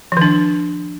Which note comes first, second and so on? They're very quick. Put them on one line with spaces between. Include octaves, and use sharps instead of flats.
F3 D#3 D4